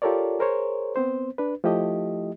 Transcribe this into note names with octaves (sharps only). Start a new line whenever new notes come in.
F4 G4 A4 A#4 C#5 D5
G#4 A#4 C5 C#5
B3 C4 C5
D4 B4
F3 A3 E4 G4 D#5